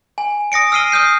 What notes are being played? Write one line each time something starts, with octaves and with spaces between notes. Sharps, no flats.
G#5
D#6 A#6 C#7 D7
E6 F6 C7 D#7 G7
D#6 F6 G6 C7